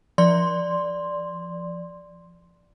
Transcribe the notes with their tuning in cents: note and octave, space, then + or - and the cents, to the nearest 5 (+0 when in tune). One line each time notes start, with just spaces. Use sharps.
F3 -20 D5 +0 C6 +0